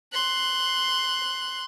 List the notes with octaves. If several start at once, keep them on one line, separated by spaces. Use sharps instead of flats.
C6 F#6